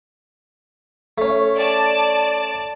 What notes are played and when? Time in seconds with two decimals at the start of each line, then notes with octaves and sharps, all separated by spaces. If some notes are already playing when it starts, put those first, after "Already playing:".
1.18 A3 C#4
1.57 D5 A5